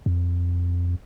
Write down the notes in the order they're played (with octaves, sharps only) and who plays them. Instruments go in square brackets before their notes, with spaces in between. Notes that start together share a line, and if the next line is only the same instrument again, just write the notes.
[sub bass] F2